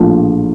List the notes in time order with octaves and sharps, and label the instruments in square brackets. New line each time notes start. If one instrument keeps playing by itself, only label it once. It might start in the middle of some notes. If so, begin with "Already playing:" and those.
Already playing: [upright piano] A#1 A2 F3